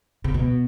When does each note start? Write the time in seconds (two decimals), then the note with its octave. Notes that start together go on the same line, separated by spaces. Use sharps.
0.24 C3
0.34 B2